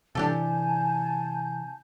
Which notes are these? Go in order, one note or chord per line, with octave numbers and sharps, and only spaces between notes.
C3 E3 D4 G4 A4 G#5 A5 G6